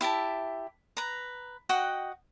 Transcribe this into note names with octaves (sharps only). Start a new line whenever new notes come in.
E4 G4 E5 A5
B4 A#5
F#4 D#5 F#5 G5